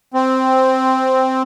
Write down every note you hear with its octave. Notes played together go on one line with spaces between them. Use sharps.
C4